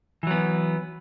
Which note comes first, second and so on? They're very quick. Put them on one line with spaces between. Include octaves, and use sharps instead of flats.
E3 F#3 B3